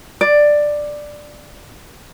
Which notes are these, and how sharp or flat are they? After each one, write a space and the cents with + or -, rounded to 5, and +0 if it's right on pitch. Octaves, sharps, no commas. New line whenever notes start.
D5 +10